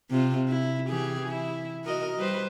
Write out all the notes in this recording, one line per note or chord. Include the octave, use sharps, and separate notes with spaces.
C3 F4
E4
E3 G4 G#4
E4
F#4 A#4 D#5
G3 B4 C5